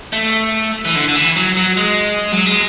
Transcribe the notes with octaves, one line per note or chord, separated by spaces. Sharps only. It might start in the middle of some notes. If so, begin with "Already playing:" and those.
A3
E3
D3
D3
E3
F#3
F#3
G#3
F#3
G#3